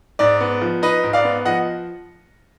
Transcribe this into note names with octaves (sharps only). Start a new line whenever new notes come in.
G#2 D5
B3
F3
D#4 B4 D#5
G#2
D5 F5
B3
F3 D#5 F#5